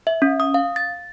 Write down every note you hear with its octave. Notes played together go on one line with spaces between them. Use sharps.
E5
C#4
D#6
F5
A6